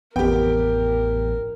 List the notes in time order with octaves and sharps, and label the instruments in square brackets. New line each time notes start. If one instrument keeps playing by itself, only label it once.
[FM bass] A1 [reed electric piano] F2 B3 [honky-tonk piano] G4 G5 [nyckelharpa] A#4